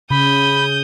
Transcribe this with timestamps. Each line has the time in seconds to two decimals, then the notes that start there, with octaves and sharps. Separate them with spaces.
0.10 C#3 B5 D#6 G6